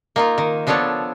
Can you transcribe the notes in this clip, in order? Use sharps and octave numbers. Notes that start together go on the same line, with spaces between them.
A#3 D#4 F4
D#3
F3 B3 D4 A4 C#5